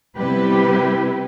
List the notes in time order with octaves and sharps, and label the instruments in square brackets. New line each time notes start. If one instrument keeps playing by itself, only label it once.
[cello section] C3 G3 B3 E4 G4 B4